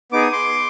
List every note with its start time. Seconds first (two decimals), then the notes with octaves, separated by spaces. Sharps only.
0.12 B3 D#4 G#4 D6
0.22 D#6
0.32 C6 D6